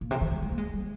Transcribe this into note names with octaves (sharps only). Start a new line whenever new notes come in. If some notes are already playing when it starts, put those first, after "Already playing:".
A#2
C3
D#3
G3
G#3
A#3
G#3
G3